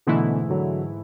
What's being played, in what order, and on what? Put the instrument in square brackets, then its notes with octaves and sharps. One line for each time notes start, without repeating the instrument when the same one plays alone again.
[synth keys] G#2 E3 A3 E4 [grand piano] B2 D3
[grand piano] D3 F#3